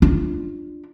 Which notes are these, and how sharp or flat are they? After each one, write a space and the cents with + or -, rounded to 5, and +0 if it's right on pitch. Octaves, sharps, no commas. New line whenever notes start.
D4 +15 F4 +0